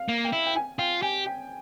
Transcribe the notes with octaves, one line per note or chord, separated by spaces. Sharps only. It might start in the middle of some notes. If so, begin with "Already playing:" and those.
Already playing: F5
A#3
G5
E4
G5
G#5
F4 G5
G4 G#5
G5